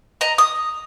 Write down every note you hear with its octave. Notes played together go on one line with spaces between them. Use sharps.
D#5 A#5
D#6